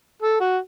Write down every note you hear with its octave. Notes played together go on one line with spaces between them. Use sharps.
A4
F#4